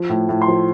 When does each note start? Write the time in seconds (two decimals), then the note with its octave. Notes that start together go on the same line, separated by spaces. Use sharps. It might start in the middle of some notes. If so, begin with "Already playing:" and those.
Already playing: F3
0.09 A2
0.29 A2
0.42 C6
0.48 F3